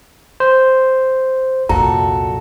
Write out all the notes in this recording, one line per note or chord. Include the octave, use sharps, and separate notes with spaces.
C5
C2 F2 A#2 F#4 A4 A#5